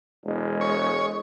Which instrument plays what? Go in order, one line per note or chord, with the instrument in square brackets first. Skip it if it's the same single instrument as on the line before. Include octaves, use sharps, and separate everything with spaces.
[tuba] E1 [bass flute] G#3
[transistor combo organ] C#5